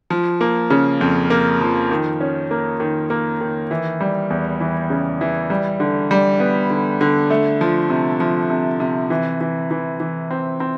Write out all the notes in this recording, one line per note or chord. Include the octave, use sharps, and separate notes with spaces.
F3
A#3
C#3
F2
A#3
F3
D#3
C#4
A#3
D#3
A#3
D#3
E3
G3
E2
E3
C#3
E3
G3
D3
G3
B3
D3
D3
A3
F3
C3
F3
C3
C3
E3
E3
E3
E3
C4
C4